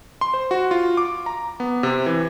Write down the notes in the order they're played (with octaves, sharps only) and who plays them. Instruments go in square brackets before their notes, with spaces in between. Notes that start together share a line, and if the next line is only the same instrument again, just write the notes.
[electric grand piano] C6
C5
F#4
F4
D6
A#5
B3
C3
E3